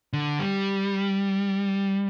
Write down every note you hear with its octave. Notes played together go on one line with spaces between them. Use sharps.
D3
G3